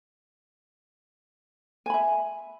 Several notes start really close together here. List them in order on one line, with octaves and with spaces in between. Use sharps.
G#5 B5 E5